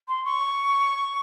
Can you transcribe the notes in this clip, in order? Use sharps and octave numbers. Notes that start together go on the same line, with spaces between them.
C6
C#6